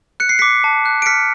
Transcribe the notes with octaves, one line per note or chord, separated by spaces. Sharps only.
F#6 C#7
C7
D6 B6 C#7
A5
F#6
D7
F6 B6 C#7